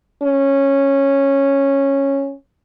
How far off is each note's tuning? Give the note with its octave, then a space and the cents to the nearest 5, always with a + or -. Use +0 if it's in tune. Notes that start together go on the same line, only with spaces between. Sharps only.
C#4 -10